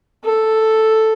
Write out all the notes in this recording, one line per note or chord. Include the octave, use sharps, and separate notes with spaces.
A4